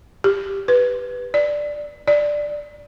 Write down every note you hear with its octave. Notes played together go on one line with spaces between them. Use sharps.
G4
B4
D5
D5